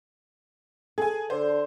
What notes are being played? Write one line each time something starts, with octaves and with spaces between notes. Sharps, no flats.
G#4 A4 G#5
D3 C5